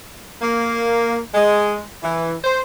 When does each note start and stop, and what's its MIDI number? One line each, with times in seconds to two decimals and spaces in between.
0.42 1.21 58
1.35 1.81 56
2.04 2.33 52
2.44 2.61 72